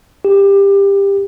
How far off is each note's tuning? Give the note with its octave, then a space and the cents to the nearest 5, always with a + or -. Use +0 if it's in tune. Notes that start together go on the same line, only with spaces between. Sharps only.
G4 +20